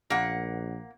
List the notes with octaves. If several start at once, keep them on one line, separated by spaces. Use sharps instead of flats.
A#1 A#3 F#5